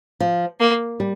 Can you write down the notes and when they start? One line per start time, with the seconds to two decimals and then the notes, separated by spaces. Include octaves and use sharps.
0.20 F3
0.60 A#3
1.00 G3